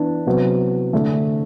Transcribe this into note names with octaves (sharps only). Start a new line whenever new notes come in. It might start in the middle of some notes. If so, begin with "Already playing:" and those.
Already playing: E3 B3 D4
C3 F#3 B3
D3 A3 D4